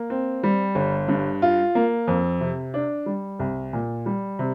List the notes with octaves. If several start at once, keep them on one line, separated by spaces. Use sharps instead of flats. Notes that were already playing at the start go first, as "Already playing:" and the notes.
Already playing: A#3
C4
G3
G1
G2
F4
A#3
F2
C3
D4
G3
C2
A#2
G3
C3